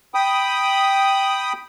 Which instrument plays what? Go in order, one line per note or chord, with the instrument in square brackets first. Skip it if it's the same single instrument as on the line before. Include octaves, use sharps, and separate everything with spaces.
[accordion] G5 B5 D#6